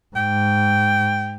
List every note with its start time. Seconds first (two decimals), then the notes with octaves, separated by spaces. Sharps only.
0.16 G#2 G5